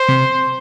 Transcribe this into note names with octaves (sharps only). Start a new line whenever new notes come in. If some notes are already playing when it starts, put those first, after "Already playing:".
Already playing: C5
C3